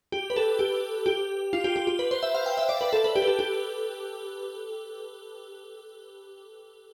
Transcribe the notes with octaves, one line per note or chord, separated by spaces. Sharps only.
G4
B4
A4
G4
G4
F4
G4
G4
G4
B4
C5
E5
F5
G5
E5
D5
B4
A4
B4
G4
B4
A4
G4